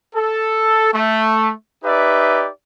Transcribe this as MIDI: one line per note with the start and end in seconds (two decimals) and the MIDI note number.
0.15 0.91 69
0.92 1.51 57
1.84 2.48 63
1.84 2.48 67
1.84 2.48 71
1.84 2.48 74
1.84 2.48 76